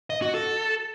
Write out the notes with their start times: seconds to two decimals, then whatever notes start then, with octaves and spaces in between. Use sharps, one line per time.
0.10 D#5
0.22 F#4
0.34 A4